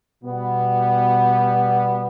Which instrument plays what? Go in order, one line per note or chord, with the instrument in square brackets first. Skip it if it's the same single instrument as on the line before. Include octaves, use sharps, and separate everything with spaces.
[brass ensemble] B2 G3 B3